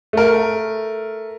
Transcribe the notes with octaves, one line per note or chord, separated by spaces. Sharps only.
A3 A#4